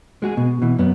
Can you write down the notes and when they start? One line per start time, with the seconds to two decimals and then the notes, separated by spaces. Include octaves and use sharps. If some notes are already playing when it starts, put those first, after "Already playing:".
0.22 G#3 F#4 G#4
0.37 B2
0.62 B2 E3
0.79 F#2 B3